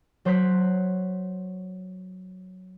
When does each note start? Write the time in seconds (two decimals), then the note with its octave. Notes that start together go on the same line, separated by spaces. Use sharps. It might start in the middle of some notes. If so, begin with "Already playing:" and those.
0.25 F#3 C5 C#5 F#6 B6